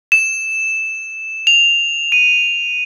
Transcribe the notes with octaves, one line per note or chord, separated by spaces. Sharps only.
E7
F7
D#7